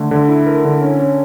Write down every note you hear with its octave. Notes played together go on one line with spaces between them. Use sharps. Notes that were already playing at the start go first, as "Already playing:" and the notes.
Already playing: D3 A3
D3
E4
A#4
D3
C#4
C#4